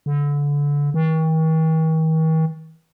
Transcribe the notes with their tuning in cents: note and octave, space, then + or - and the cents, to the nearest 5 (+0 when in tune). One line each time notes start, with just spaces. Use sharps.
D3 -25
D#3 +45